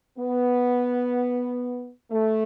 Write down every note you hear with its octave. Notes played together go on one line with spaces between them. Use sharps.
B3
A3